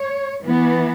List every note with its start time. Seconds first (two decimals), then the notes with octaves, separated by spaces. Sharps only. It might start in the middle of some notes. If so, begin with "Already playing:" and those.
Already playing: C#5
0.44 E3 B3